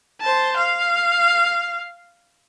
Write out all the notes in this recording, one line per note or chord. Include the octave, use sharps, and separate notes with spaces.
C5 A5
F5